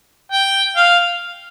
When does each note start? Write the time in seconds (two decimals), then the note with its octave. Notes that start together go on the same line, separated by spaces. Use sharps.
0.32 G5
0.77 F5